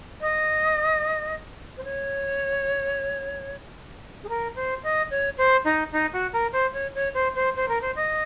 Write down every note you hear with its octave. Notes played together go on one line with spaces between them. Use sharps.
D#5
C5
C#5
G#4
A#4
C5
D#5
C#5
C5
D#4
D#4
F#4
A#4
C5
C#5
C#5
C5
C5
C5
A#4
C5
D#5